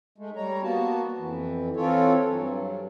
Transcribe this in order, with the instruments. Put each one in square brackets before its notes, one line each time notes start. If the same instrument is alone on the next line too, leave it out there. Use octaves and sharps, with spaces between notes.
[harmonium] G#3 A3
G3 C#5 A#5
A#3 B3 F#4 A5
F2 E3
E3 C4 F4 A4 C#5
G2 F#3